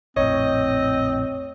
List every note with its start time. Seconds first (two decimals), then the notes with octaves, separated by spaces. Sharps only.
0.17 A#1 F2 A2 C4 C#5 D#5